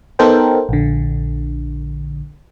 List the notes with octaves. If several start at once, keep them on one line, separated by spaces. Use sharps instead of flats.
B3 D#4 A4 A#4 C5 G5
A#1 D3